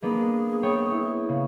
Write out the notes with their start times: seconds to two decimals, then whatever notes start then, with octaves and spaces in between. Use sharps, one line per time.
0.03 A#3 B3 D4 G#4
0.63 B3 C#5 G5
0.91 E4
1.29 C#3